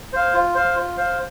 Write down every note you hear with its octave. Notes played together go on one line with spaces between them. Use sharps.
C5 F5
F4
C5 F5
F4
C5 F5